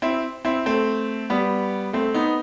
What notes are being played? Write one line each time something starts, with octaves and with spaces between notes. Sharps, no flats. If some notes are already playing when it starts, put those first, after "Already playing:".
C4 E4
C4 E4
A3 C4
G3 B3
A3 C4
B3 D#4